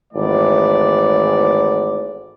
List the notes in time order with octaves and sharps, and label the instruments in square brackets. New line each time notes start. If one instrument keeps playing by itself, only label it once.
[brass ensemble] G#1 E3 A3 B3 D5